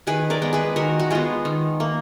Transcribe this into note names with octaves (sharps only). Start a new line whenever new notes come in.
D#3 G#4 B4
A#4 D5
G#3 B3
G#4 B4
D#3 F#4 A#4
F#4
G#3 B3 F4 G#4
D#3
A#3